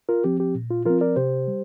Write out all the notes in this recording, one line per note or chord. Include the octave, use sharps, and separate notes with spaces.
F4 A#4
F3 C4 G4
G4
A#2
F4
F3 C4 F4 A#4
A#4 D5
C3 G4 C5
G3